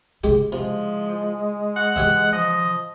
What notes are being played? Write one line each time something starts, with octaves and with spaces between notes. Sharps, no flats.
C#3 G#3 E4 G4
C3 F3 G#3
F#5
C#3 E3 G4 C#5 E5
F3 D#5